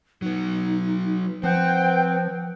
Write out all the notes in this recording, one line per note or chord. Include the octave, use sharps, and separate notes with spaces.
F#3 B3 D#4
F3 C4 B4 C5 F#5 G5